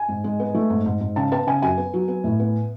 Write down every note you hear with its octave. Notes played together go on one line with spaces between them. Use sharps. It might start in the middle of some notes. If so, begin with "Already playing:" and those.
Already playing: G#5
G#2
G#3
B3
A3
G#2
G#2
G#2
C#3 A5
B3 A5
C#3 G#5
F#2 G#5
B3
F#3
B3
A2
B3